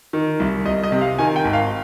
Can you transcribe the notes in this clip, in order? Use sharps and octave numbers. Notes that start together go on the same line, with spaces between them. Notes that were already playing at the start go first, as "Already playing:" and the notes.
D#3
C2
C2 D#5
D#5
C3
F5
D#3 G#5
G5
G#1
F5